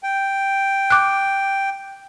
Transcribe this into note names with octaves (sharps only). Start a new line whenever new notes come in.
G5
D6 F#6